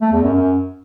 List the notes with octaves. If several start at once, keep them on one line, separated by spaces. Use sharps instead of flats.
A3
E2
F#2
F#2